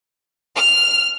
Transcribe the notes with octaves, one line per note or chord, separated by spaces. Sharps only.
F6